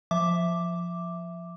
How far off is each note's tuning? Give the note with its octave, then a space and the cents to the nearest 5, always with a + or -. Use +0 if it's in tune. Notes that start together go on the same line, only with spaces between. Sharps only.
F3 +0 E5 +0 D6 +0